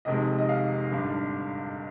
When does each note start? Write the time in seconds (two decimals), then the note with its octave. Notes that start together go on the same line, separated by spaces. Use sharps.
0.05 F1 F2 C3 D#3 G#3 D#5
0.38 D#5
0.49 F5
0.92 G#1 G2 D3